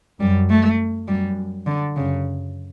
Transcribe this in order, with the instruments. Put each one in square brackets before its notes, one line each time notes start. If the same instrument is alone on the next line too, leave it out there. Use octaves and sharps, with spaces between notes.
[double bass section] F#2 [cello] G3
[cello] A3
[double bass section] F#2 [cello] G3
[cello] D3
[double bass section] F#2 [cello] C#3